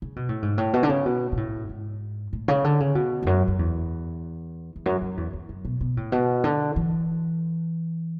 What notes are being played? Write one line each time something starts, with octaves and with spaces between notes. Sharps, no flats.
C#3
B2
A2
G#2
A2
B2
D3
C#3
B2
B2
A2
G#2
A2
C#3
D3
C#3
B2
E2
F#2
F#2
E2
E2
F#2
F#2
E2
E2
F#2
B2
B2
A2
B2
D3
E3